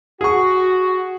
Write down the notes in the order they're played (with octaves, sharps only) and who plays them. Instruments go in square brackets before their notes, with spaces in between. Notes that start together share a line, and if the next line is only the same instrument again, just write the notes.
[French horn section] F#4 [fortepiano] G#4 C#6